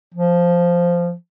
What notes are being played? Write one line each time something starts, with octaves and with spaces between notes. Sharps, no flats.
F3